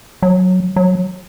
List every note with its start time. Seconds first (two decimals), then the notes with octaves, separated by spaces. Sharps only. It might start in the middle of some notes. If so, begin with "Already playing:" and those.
0.22 F#3
0.76 F#3